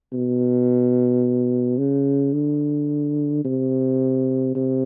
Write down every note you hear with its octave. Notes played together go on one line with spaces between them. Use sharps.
B2
C#3
D3
C3
C3